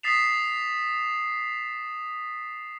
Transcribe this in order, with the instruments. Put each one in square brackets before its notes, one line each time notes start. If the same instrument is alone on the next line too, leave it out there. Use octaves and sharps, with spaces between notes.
[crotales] D#6 A6 B6 C7 E7 F7